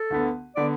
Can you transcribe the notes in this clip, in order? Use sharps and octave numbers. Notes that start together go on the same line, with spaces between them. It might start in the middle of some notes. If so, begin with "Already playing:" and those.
Already playing: A4
D2 D3 B3
D3 B3 D5